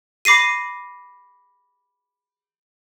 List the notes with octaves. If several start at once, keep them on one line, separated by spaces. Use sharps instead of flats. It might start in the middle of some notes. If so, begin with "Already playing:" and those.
B5 D6 A#6 C7 D#7